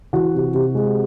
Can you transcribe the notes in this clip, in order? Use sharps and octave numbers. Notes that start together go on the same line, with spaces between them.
E3 F#4 F#5
C3
C3
G#3